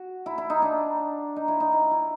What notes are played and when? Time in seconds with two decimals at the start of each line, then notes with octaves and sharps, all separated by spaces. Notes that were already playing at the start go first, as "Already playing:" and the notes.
Already playing: F#4
0.26 E4
0.38 E4
0.50 D#4
0.62 D4
1.36 D#4
1.48 E4
1.60 D#4
1.72 E4
1.91 E4